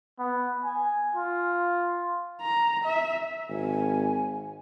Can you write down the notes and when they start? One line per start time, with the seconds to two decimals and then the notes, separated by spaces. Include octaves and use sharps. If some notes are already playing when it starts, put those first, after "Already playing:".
0.19 B3
0.64 G#5
1.15 F4
2.41 A#5
2.85 E5
3.49 G#1 G#5